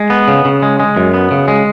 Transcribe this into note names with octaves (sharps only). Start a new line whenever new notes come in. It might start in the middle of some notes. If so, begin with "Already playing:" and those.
Already playing: G#3
B3
C#3
C#3
G#3
G#3
F#2
B3
C#3
G#3